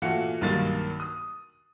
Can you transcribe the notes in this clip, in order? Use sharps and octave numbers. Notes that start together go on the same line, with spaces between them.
A#2 E3 A3 F#4 F5 C#7
B1 G2 D#3 A#3 F5 A6
D#6